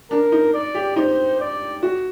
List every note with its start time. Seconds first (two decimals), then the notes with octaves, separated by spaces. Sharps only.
0.11 D4 A#4
0.32 D#4
0.54 D5
0.75 G4
0.96 D#4 C5
1.40 D5
1.83 F#4